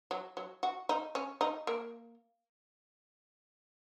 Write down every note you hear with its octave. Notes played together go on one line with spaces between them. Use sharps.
F#3
F#3
F#4
D#4
C#4
D#4
A#3